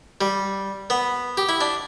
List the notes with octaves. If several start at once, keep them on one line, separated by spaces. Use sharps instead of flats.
G3
B3
G4
E4
D4